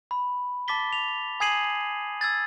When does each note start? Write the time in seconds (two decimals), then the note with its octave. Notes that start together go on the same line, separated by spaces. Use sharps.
0.11 B5
0.68 A5 D6 A6 B6 G7
0.93 F7
1.40 G#5 D#6 G#6 C7 D#7 F#7
2.21 E6 G#6 A6